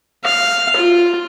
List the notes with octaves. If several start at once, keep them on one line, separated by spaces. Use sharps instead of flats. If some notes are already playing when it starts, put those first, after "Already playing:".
F5
F4